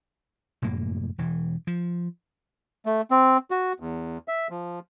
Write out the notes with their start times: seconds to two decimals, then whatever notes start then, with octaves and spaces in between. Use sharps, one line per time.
0.62 F1 F#2 A2 A#3
1.18 E1 E3
1.67 F3
2.86 A3
3.11 C4
3.51 F#4
3.80 E2
4.28 E5
4.50 F3